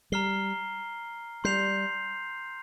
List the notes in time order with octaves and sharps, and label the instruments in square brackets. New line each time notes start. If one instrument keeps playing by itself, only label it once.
[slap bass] G3 [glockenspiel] A#5 F6 C7 G7
[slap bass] G3 [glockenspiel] C6 G6 C7 F7